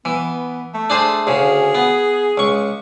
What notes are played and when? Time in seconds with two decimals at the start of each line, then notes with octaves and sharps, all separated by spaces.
0.05 E3 B3
0.74 A3
0.90 D4 G#4 C5
1.27 D2 C#3 G#4
1.75 B3
2.38 C#2 C#6